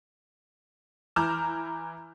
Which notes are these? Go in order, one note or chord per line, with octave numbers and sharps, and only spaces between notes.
E3 A#5 D6 F6 G6 E7